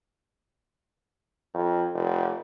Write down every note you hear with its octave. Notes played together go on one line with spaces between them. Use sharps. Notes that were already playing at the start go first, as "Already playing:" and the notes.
F2
F1